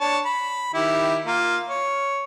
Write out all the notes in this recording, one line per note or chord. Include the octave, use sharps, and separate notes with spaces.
D4 C#5 A5
B5
D#3 E4 G4
A#3 F4
C#5